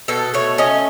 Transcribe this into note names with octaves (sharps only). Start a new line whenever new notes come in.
B2 A4
A3 C#5
C#4 D#5